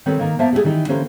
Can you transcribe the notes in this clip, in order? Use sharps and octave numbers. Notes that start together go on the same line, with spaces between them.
D#3 G3 C4 A4 B4 C#5
D#3 A#3
F3 A#3 B3 C5 E5 A5
G3 A3 F#4 G#4
D#3 E3 G3 D#4
D3 E3 A#3 C#4 G4 C5